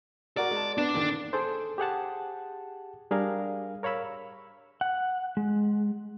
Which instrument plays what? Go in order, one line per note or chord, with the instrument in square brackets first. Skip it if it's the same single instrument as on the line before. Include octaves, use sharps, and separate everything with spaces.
[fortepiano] F#4 A#4 [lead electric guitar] D5
[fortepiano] G#3 A5
[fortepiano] B3 [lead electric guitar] D4
[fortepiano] A#2 D3 D#3
[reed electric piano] G#4 A4 C5
G4 G#4 F#5 A5
G3 D4 G#4 A#4 F5
A#4 C#5 F5 B5 E6
[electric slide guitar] F#5
G#3